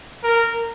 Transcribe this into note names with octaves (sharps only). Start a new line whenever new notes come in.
A#4